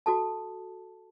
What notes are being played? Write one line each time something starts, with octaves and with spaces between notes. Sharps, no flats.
F#4 A4 A5